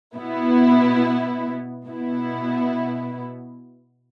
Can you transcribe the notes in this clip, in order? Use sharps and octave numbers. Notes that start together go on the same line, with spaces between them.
B2 B3 E4
B2 B3 E4